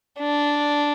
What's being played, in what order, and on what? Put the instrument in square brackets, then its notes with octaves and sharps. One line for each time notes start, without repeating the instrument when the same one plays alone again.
[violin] D4